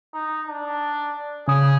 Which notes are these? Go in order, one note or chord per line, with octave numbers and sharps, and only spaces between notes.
D#4
D4
C#3 G#4 D#6